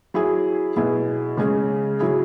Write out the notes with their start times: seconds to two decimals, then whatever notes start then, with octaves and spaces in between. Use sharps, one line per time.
0.14 F#3 E4 G#4
0.76 B2 F#3 E4 G#4
1.37 C#3 G#3 C#4 G#4
2.00 C#3 F#3 E4 G#4